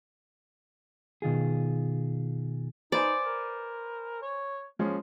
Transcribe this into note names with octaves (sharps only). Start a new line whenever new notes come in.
B2 D#3 F4 G#4
D#4 B4 C5 D5 G#5
A#4
C#5
F3 G#3 A#3 C#4